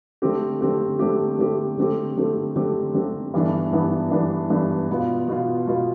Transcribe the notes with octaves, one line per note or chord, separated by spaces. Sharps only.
D3 A3 C4 G4
D3 A3 C4 G4
D3 A3 C4 G4
D3 A3 C4 G4
D3 A3 C4 G4
D3 A3 C4 G4
D3 A3 C4 G4
D3 A3 C4 G4
G2 E3 B3 D4
G2 E3 B3 D4
G2 E3 B3 D4
G2 E3 B3 D4
B2 B3 F4
B2 B3 F4
B2 B3 F4